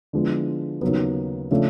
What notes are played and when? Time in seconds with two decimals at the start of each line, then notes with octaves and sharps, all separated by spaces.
0.13 D3 F3 G#3 B3 E4
0.81 D#2 C#3 F#3 B3
1.51 C#3 F3 A3 D4